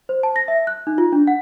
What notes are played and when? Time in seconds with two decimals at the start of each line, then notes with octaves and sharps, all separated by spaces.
0.09 C5
0.23 A5
0.36 A#6
0.48 E5
0.67 F#6
0.87 D#4
0.98 F4
1.13 D4
1.27 F#5